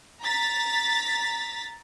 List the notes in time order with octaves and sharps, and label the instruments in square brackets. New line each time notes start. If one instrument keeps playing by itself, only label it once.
[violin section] A#5 A6 B6